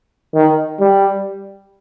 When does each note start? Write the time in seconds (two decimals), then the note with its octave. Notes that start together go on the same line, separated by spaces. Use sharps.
0.34 D#3
0.80 G3